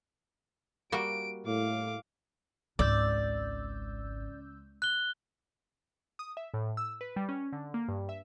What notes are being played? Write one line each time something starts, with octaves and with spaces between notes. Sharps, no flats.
G3 A#3 F#4 D7
A2 F5 D6
G#1 C#2 D5 E6 G6
F#6 G7
D#6
E5
A2
E6
B4
G3
C#4
D3
A#3
G2
E5